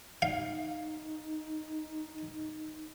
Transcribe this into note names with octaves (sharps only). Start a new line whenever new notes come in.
D#4 F5